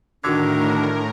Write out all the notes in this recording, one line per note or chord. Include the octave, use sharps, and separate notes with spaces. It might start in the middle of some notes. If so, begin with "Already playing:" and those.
A2 D3 D#3 D4 F#4 A#4 G#6